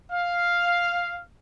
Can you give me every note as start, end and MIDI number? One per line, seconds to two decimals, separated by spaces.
0.11 1.21 77